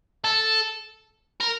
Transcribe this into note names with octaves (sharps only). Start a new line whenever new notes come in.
A4
A#4